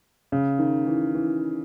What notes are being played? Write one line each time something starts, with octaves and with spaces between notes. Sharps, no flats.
C#3
D#3
E3
E3